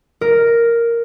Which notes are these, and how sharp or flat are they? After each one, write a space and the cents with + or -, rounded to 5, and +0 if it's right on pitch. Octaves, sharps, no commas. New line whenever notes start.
A#4 +0